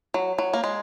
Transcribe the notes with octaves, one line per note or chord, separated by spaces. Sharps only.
F#3
F#3
A#3
G#3